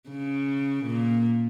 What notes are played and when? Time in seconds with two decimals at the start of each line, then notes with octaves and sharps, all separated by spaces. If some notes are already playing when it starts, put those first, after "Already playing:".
0.09 C#3
0.85 A#2